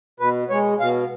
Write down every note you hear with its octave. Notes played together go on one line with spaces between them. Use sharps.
B2 B4
G#3 C#5
B2 F5